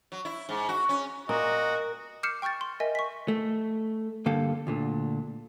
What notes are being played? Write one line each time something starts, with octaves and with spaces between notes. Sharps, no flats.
F#3
E4
G#2
F#4
C#4
A#2 F#4 A#4 D#5
D6 F6 G6 C7 C#7 E7
G5 C#6 F6 G6 A6
C6
A#4 D#5 E5 G#5
C#6 B6
A3
G2 D3 A#3 D4 A4 G5
D2 A#2 D3